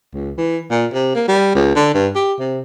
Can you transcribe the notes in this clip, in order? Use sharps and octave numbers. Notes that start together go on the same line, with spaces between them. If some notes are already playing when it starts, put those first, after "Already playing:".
C#2
E3
A#2
C3
A#3
G3
C#2
D3
G2
G4
C3